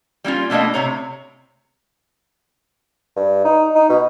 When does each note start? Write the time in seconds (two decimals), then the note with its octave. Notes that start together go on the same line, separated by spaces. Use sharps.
0.24 G3 A#3 C#4 F4
0.50 B2 A3 A#3 D4 D#5
0.74 A2 C3 C#5 A#5
3.16 G2
3.45 D#4
3.75 D#4
3.89 B2